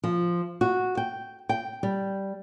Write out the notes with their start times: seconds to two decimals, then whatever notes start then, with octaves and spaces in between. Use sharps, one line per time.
0.04 F3
0.61 F#4
0.97 G5
1.49 G5
1.83 G3